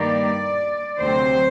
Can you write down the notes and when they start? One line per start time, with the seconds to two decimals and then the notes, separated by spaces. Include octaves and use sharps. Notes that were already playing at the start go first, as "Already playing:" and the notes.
Already playing: G2 D#3 G3 A#3 D5
0.98 D2 C3 F#3 C4 C5